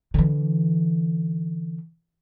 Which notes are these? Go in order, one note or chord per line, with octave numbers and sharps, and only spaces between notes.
D3 E3